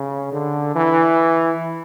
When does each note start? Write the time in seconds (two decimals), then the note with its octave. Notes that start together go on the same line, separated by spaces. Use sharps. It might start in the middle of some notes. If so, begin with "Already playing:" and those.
Already playing: C#3
0.33 D3
0.76 E3